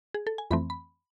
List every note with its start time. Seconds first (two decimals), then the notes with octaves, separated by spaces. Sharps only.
0.14 G#4
0.27 A4
0.38 G#5
0.51 F2 E3 A3 C4 B5
0.70 B5